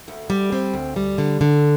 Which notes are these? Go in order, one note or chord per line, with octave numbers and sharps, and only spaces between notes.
D2
G3
C4
D2
G3
D3
D3